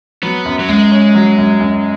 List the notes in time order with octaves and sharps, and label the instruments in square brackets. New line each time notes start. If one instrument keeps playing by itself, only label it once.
[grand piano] F#3 [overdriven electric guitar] B3
[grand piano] F#2
[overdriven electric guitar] F#3
[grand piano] F#2 [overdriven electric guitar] G#3
[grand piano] C#4
F#3
F#2
F#2